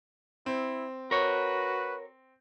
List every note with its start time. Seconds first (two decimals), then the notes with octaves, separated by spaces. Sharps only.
0.46 C4 E4
1.11 F#4 A#4 B4 C#5